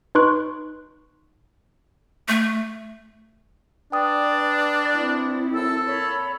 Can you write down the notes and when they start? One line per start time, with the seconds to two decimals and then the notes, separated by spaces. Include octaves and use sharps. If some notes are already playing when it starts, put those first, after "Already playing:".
0.15 D#4 B4 C6 C#6 F#6 D7
2.28 A3
3.92 D4 B4 D5 G5 D#6
4.96 C4 E4
5.54 F#2 A4 E6
5.87 A#2 C#5 B5